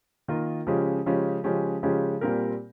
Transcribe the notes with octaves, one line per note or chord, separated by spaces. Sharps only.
D#3 A#3 F4 A#4
C#3 F3 G#3 C#4 G4
C#3 F3 G#3 C#4 G4
C#3 F3 G#3 C#4 G4
C#3 F3 G#3 C#4 G4
A#2 G3 C4 G4 A#4